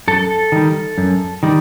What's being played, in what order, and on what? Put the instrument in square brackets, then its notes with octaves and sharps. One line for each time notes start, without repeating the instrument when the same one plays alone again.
[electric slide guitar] F#2 A4
D#3 G3
F#2
D#3 G3